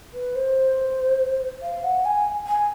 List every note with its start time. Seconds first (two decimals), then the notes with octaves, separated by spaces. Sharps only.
0.14 B4
0.35 C5
1.62 F5
1.84 F#5
2.05 G#5
2.47 G#5